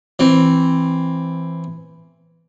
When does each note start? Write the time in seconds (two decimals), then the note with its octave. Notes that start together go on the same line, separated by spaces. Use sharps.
0.19 E3 C4